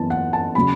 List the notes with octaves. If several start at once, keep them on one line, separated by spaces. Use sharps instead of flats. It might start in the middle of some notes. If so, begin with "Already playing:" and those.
Already playing: F#2 E3 B3 A5
F#5
A5
C#3 F#3 C#4 B5